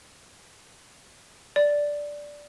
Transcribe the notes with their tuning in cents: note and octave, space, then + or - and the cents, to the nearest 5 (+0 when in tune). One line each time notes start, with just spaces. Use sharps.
D5 -5